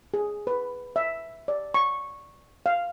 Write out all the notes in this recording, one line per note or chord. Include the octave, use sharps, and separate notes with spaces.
G#4
B4
E5
D5
C#6
F5